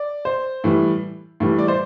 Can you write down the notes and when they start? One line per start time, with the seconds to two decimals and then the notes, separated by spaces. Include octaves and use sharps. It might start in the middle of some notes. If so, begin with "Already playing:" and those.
Already playing: D5
0.25 C5
0.64 A2 E3 G3
1.40 A2 E3 G3
1.58 D5
1.68 C5